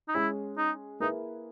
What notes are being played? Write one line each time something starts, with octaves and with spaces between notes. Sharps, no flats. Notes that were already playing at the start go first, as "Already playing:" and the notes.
D#4
G#3 C#4 E4 G#4
D#4
A#3 D#4 E4 G#4 B4